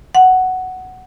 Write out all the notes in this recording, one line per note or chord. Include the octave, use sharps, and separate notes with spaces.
F#5